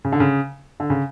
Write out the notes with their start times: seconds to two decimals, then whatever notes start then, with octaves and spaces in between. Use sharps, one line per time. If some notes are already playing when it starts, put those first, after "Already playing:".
0.05 C#3
0.12 D3
0.20 C#3
0.80 D3
0.90 C#3